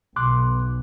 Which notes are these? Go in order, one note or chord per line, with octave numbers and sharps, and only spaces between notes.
B1 C6 D6 F#6